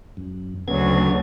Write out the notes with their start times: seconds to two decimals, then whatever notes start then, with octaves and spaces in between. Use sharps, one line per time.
0.17 F#2
0.68 D2 C#3 F#3 B3 G#6